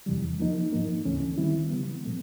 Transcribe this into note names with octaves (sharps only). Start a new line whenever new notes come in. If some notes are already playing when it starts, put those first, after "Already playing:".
E2 C3 E3 G3
F3 A#3 D#4
G#2 F3 A#3 D#4
D2 C#3 E3 A3 C#4
D#3 G3 C4 E4
C#3 E3 G3 B3
A#2 F3 A3 C4